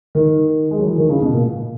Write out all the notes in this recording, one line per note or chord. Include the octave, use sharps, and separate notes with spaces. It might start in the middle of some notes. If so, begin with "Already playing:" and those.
D#3
G#3
F#3
E3
D#3
C#3
B2
A#2